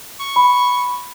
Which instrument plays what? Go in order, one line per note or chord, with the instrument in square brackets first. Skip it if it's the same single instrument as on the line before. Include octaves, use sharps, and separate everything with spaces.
[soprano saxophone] C#6
[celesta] B5